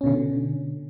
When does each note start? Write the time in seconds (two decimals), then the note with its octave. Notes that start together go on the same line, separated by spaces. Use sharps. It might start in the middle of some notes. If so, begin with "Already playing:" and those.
0.01 C#4
0.04 B2
0.06 D3